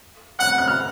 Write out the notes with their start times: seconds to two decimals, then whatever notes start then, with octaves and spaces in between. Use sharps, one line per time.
0.39 F#5 F#6
0.58 F#6
0.68 F6